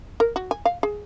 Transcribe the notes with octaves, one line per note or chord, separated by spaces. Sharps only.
A#4
F#4
G#5
F5
G#4